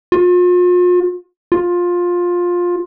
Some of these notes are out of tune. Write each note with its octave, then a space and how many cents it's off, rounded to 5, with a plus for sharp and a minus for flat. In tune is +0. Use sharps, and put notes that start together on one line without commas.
F4 +40
F4 +15